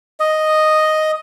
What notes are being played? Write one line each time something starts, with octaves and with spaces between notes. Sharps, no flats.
D#5